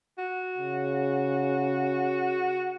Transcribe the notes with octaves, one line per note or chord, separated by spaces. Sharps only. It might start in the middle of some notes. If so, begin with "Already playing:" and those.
F#4
C#3